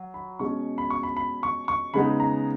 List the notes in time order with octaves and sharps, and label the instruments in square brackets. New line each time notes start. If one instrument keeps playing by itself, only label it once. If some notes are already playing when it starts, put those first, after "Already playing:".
Already playing: [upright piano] F#3
B5
B2 G#3 C#4 C#6
B5
C#6
B5
B5
C#6
C#6
C#3 G#3 B3 D#4 B5
A#5